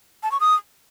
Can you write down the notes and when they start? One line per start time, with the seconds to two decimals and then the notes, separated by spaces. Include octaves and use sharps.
0.23 A5
0.32 C#6
0.40 D#6